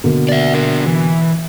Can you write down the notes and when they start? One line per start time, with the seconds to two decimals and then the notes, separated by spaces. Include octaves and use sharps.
0.04 B2 D3 A#3
0.29 D5 E5
0.54 D4 A#4
0.86 E3